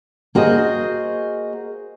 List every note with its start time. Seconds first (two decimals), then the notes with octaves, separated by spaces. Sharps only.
0.35 A#3 F#4 G#4 C5 D#5